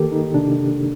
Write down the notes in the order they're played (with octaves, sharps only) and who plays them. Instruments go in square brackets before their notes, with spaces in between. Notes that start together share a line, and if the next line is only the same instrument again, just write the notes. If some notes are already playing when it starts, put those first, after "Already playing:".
Already playing: [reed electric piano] D#3 A#3 G4 A4 A#4
D#4
C3 D4